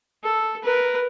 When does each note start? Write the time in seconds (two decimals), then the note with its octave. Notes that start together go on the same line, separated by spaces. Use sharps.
0.23 A4
0.63 A#4 B4